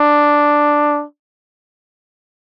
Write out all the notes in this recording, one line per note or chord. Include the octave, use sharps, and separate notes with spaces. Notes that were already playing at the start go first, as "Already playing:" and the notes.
Already playing: D4